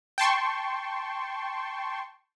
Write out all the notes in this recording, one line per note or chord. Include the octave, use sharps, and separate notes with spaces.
G5 A5 C6 C#6